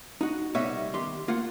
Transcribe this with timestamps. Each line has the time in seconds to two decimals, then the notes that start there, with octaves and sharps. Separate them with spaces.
0.21 D#4 F#4
0.55 C2 G3 B3 C#5 D#5 E5
0.94 D#3 G4 C6
1.28 A#3 F4 F#5